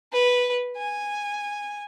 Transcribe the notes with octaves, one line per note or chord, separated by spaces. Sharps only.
B4
G#5